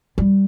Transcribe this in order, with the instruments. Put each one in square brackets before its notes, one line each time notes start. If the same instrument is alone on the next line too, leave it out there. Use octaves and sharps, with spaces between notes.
[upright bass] G3